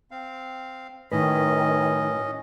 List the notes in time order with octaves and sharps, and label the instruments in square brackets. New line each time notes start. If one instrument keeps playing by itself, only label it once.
[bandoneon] C4 F5
[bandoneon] F#2 C#4 D#5 [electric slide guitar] A2 B4 [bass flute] D#3